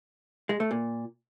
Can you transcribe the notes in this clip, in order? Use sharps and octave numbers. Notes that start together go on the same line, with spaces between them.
G#3
A3
A#2